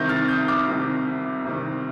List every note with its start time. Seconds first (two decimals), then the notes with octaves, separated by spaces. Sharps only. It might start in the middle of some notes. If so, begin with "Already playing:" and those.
Already playing: C2 C3 D#3 G6 A#6
0.09 F6 A6
0.28 D#6 G6
0.48 D6 F6
0.67 C2 C3 D#3
1.44 C2 C3 D#3